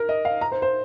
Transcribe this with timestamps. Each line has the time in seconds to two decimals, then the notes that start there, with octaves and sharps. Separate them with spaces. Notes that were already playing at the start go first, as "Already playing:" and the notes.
Already playing: A#4
0.09 D#5
0.25 F5
0.41 A#5
0.52 C5
0.62 C5